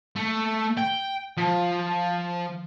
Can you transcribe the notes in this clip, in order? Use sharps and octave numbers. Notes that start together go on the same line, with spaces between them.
A3
G5
F3